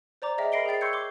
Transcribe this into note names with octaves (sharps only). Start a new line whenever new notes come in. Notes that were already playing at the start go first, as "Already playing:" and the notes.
C5 D5 A#5 D6
G#4 D#5 E5 G5
A#4 B5 A#6 C7 D7 G7
G#4 C5 G5 A6 C7
C6 C#6 E6 G6 G#6 C#7
D6 C7 G7